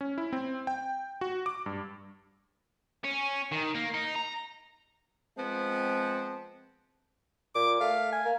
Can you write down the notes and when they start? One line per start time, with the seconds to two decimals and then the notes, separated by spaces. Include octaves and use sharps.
0.01 C#4
0.18 E4
0.33 C4
0.67 G5
1.21 F#4
1.46 D6
1.66 G2
3.04 C#4
3.52 D#3
3.75 A#3
3.94 D#4
4.15 A#5
5.38 F3 G#3 B3 C4
7.55 A#2 D6
7.81 A3 F5
8.12 G#5
8.25 A#3